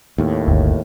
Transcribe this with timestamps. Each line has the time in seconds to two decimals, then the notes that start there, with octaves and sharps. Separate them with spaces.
0.18 D#2 A2
0.47 G1 D2